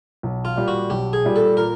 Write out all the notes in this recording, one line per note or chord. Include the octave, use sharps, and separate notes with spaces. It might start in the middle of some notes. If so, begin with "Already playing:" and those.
B1
F4
A#2 G3
F#4
B1 G4
G#4
A#2 G3
A4
A#2 A#4